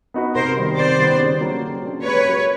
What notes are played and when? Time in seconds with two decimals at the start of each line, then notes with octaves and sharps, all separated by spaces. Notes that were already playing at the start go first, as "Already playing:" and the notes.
0.14 B3 D#4 F#4 B4
0.35 C3 A#4 C5
0.56 D#3 G3 B3
0.77 C3 C5 D5
0.99 D#3 G3 B3
1.19 C#3
1.41 F#3 A#3 D4 G4
1.62 C#3
1.83 F#3 A#3 D4 G4
2.03 G#3 B4 C#5
2.24 C#4 F#4 A#4